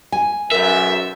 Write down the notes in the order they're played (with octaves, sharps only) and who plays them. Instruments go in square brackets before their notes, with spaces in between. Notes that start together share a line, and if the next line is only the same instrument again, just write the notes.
[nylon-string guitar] G#5
[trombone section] B1 F#2 [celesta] A#4 [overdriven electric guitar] E5